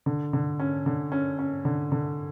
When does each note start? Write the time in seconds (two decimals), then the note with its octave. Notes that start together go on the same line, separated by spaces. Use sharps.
0.06 D3
0.33 D3
0.60 C#4
0.86 D3
1.12 C#4
1.39 C#4
1.65 D3
1.92 D3